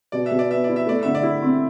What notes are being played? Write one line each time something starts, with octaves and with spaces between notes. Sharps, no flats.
B2 D5
E5
B2
D5
B3 E5
E4 D5
E5
A3 D5
D3 E5
D5
E4
C4